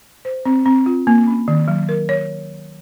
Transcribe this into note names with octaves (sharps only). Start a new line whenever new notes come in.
C5
C4
C4
F4
A#3
C#4
D#3
F#3
A#4
C#5